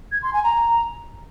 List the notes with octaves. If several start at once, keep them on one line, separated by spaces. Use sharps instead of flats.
G#6
C6
G#5
A#5